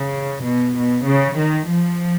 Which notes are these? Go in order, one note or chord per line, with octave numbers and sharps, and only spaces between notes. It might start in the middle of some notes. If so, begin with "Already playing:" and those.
Already playing: C#3
B2
B2
C#3
D#3
F3